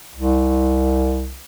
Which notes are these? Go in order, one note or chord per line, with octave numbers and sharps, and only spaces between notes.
C2